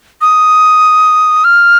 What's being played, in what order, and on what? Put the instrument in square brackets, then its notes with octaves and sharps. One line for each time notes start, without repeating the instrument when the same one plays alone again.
[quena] D#6
F6